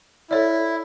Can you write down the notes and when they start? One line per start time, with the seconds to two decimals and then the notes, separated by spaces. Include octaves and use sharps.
0.31 E4 A4 C#5 D5